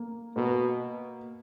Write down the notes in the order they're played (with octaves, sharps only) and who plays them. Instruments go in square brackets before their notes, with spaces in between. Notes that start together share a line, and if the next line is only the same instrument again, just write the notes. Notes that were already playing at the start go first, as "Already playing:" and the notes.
Already playing: [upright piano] A#3
[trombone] B2 [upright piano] A#3